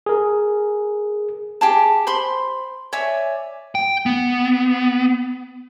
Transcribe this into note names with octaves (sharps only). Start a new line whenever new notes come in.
G#4 A#4
G4 G#4 A5
C5 B5 C6
C#5 D5 E5 G#5
G5
B3